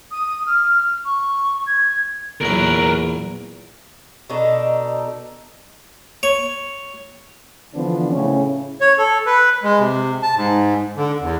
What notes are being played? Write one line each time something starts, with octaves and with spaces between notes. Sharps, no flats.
D#6
F6
C#6
G#6
A#1 E2 F#3 D4 A#4 B4
B2 D4 D#4 A4
C#5
D3 E3 F3 B3 D4
A2 C#3 C#4
C#5
A4
B4
G#3
C3
A5
G#2
D3
E2